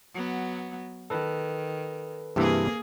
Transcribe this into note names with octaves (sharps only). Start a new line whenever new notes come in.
F#3 B3
D#3 A4 B4
G2 C3 E3 A#3 G#4